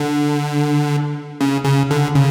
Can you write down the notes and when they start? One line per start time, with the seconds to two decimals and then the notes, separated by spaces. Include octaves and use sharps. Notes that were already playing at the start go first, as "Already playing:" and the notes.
Already playing: D3
1.41 C#3
1.65 C#3
1.91 D3
2.15 C#3